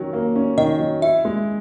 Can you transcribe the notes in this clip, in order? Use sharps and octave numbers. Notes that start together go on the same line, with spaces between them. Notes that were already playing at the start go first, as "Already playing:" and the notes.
Already playing: D#3 F#3 C#4
A#3
C#4
D#3 D#5
F#3
E4 E5
G#3